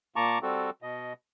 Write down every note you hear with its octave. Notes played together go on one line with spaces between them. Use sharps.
A#2 A#3 A5 A#5 C#6 D6
G3 C4 F#4 A4
B2 D#5